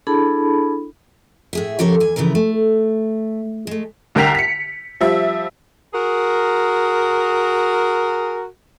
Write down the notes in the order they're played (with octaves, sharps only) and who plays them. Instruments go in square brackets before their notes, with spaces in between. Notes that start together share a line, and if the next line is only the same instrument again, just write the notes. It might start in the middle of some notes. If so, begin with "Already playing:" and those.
[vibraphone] D4 E4 G#4 A4 A5 B5
[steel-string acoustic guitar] A2 G#4 E5
C#3 F3 G4 A4 A#4 C#5
E2 G#5
C#3 E3 F3 E4 A#4
A3
G#3 A3
[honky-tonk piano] C2 D3 A#4 G5 B6 F7
B6 C#7
F3 G3 E5
[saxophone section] F#4 G#4 A#4